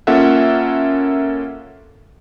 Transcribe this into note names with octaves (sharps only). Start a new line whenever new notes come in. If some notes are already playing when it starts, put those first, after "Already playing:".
A#3 C#4 F4 A4 E5 F#5